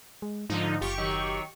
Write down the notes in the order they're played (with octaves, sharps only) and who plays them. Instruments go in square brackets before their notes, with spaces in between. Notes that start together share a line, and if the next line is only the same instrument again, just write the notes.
[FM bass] G#3
[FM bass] G#2 [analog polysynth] D3 F3 D#4
[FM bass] F#1 [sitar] F4 [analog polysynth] G4 C#6
[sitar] D#3 F#3